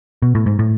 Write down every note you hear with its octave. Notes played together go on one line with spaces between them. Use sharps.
B2
A2
G#2
A2